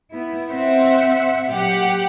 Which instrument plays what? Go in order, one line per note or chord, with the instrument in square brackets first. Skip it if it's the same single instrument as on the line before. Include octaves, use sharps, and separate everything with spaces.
[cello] B3 E4
[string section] C4 [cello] E5 F#5
[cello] A#2 F#3 [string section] G4 F#5